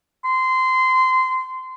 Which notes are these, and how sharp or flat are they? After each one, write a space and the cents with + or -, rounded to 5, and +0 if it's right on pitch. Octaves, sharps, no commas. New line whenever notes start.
C6 -20